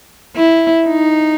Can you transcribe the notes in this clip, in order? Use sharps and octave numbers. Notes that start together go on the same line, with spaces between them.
E4
D#4